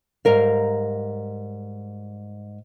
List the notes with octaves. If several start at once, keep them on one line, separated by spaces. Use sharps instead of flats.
G#2 G3 A#4 F5